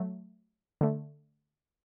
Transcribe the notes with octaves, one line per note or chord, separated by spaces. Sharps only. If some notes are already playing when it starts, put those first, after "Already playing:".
Already playing: F#3 A3
D3 A3